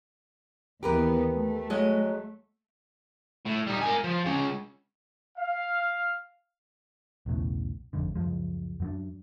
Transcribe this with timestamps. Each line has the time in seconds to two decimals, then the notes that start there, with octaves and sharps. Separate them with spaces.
0.83 D#2 E3 B3 G4 A#4 B4
1.32 A3
1.70 F#3 G#3 D#5
3.45 A2
3.67 G3 D#4
3.81 A#4 G#5
4.04 F3
4.26 G#3 C#4
5.38 F5
7.26 B1 E2 A2 C#3
7.93 G#1 F2 G#2 D3
8.15 C#2 F#2 F3 G#3
8.80 F#2 F#3 D4